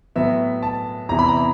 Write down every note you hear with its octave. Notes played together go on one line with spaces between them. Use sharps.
A2 F#3 B3 E5
A5
E2 C3 E3 A#5
B5
A#5